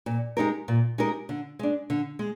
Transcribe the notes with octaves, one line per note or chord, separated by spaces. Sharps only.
A#2
G#3 D#4 G4 A#4
A#2
G#3 D#4 G4 A#4
D3
G#3 D4
D3
G#3